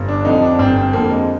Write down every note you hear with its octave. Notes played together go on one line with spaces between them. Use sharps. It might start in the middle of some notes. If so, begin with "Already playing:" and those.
Already playing: G1
D4
F2 D3 D#4
D4
G1 C4
C4
F2 D3 A#3
G#3